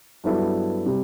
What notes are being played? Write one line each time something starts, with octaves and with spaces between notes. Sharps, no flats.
G2 F#3 B3 E4 A4
C3 G3